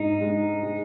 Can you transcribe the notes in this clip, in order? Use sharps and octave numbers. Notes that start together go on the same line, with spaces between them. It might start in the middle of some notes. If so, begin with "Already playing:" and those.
Already playing: G#2 D#4
G#3
G#3